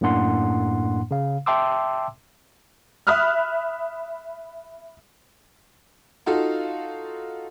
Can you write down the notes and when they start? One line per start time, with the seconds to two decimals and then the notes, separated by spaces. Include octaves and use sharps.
0.01 F#2 A2 A#3 D4 F#5 C6
1.11 C#3 F5
1.46 E5 G5 A5 C6 D6 E6
3.07 E5 B5 D#6 F6 F#6
6.26 D#4 F4 F#4 A4 F5